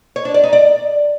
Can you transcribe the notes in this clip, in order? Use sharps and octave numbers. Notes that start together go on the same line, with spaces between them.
C#5
D4
D5
D#4
D5